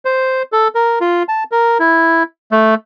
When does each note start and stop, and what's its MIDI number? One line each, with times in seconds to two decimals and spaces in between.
0.05 0.43 72
0.52 0.68 69
0.75 0.99 70
1.01 1.23 65
1.29 1.44 81
1.52 1.78 70
1.80 2.23 64
2.52 2.75 57